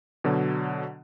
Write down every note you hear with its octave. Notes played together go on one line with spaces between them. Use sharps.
B2 D3 F#3